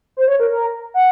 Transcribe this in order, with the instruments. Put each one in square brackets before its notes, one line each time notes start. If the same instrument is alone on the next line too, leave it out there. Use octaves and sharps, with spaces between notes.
[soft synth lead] C5
C#5
A#4
A#4
F#5